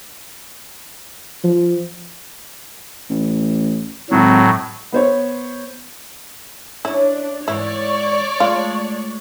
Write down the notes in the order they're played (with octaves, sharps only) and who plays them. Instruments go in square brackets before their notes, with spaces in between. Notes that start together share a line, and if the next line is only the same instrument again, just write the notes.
[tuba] F3
[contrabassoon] A1
[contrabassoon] G#1 [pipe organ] A2 F#3
[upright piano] B3 C5 C#5
[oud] C#4 [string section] D4 [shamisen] E4
[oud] G#2 E3 [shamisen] E4 [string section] C#5 D5 C#6
[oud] G#3 A3 [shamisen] F4